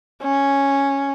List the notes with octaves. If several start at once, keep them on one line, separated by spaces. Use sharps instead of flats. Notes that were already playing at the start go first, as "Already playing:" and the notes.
C#4